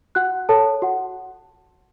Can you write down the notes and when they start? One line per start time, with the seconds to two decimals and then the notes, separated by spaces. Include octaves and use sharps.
0.15 F#4 F#5 F#6
0.49 A4 C#5 A5
0.82 F#4 F#5